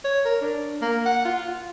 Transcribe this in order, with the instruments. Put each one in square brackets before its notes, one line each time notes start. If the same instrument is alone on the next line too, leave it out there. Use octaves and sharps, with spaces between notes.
[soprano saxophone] C#5
A#4
D4
A#3
F#5
F4
F4